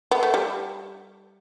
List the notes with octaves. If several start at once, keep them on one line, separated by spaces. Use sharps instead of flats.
B3
A3
G3